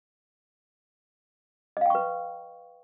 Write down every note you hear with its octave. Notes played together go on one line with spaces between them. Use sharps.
B4 D#5 F5 G5 C#6